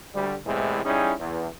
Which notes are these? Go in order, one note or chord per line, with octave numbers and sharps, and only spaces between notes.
D2 G3
E2 A2 C3 E3 G#3
G3 C#4 D#4 E4 G#4
E2